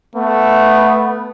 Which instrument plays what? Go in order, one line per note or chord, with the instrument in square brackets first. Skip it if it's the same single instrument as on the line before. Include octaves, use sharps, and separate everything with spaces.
[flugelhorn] A3 [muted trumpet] B3